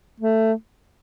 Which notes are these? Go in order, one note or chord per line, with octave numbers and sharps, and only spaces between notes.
A3